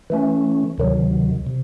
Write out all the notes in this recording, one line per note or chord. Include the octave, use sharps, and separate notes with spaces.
E3 A3 C#4
D2 C3 D#3 F#3
C3